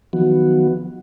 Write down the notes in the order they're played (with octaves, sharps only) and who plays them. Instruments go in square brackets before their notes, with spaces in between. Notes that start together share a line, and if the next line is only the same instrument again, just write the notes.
[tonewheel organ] D#3 F3 F#3 B3 F#4